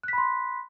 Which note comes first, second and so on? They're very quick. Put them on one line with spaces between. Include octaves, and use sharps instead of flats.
F#6 B6 B5 C6